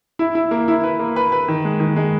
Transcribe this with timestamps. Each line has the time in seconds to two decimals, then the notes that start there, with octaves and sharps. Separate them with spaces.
0.19 E4
0.35 E4
0.51 A#3
0.68 E4
0.83 B4
0.99 A#3
1.16 B4
1.32 B4
1.48 D#3
1.65 G#3
1.80 D#3
1.96 G#3